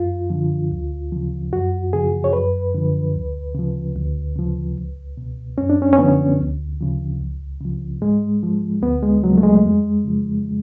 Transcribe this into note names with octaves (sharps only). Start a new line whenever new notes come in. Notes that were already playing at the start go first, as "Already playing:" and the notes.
Already playing: F#2 F4
D3 F3
D2
C#3 F3
F#2 F#4
C#3 F3 G#4
C#5
F#2 B4
D3 F3
D2
C#3 F3
D2
C#3 F3
C#2
B2
F#2 C#4
D4
C#4
C#4
D3 F3 B3
D2
C#3 F3
C#2
C#3 F3
G#2 G#3
F3
D2 B3
G#3
C#3 F3 F#3
A3
G#3
F2
C#3 F3